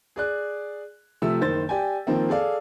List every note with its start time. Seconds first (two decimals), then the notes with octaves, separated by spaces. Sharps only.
0.16 G#4 D5 F#6
1.22 C3 F3 A3 E6
1.40 F#1 D#3 C5 A6
1.69 G4 D5 G#5
2.07 D#3 F3 A#3 C4
2.29 G#4 A4 D5 F5